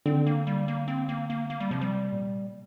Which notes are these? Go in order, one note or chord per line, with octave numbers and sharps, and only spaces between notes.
D3 C4
A#3
G3
A#3
C4
A#3
A#3
A#3
G3
C3 F3
G3
A#2